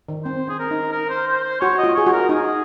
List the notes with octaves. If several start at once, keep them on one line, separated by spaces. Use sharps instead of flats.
D#3
C4 C5
C#4 G#4
A#4
D#4
A#4
C5
C5
C5
F#4 C#5
F4 D#5
G#4 C#5
F#4
A#4
D#4 G#4